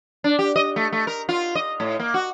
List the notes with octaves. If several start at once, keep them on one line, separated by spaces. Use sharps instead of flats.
D4
G4
D#5
A3
A3
A#4
F4
D#5
A2
A#3
F#4